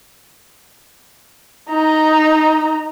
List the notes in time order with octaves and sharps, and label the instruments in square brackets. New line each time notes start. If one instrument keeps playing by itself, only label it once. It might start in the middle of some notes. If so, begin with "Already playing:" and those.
[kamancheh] D#4 A#5